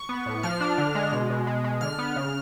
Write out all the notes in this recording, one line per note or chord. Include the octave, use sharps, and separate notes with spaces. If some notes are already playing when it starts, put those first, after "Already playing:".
Already playing: C#6
B3
A2
F3 F6
D4
D3
G#3
B2
B2
G#3
G#3
D3 F6
B3
C#3